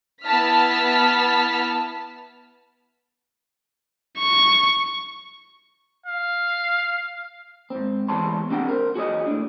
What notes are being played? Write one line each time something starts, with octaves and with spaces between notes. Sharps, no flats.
B3 E4 A5 F6 B6
C#6
F5
G#2 C4
E2 G3 G#3 C#5 A5 C6
C4 D4 G4 F#5 G5
A#4 C5
F#4 G#4 C#5 D#5
A2 D4